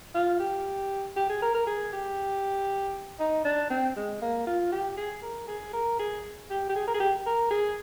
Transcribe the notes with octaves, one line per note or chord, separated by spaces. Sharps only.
F4
G4
G4
G#4
A#4
A#4
G#4
G4
D#4
D4
C4
G#3
A#3
F4
G4
G#4
A#4
G#4
A#4
G#4
G4
G4
G#4
A#4
G#4
G4
A#4
G#4